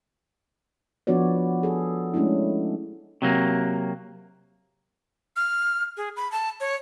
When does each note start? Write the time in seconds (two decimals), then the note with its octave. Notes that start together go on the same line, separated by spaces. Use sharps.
1.07 F3 B3 D4 F#4 C#5 D5
1.63 G#4 A4
2.14 G#3 A3 C#4 D4 E4
3.22 C3 F#3 A#3
5.36 F6
5.97 G#4
6.17 B5
6.32 A5
6.60 C#5